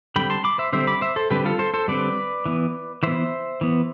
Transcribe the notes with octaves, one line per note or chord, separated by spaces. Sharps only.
D3 G3 C4 G5 B5
A5 C6
B5 D6
C5 E5
D3 G3 C4 C5 E5
B5 D6
C5 E5
A4 C5
D3 G3 C4 G4 B4
F4 A4
A4 C5
A4 C5
D3 G3 C4 B4 D5
E3 B3
E3 B3 C5 E5
E3 B3